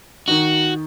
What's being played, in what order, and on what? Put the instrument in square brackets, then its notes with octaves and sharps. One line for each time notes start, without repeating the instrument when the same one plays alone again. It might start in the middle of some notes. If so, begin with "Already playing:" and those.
[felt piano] D#3 D#4 [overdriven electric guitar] F#4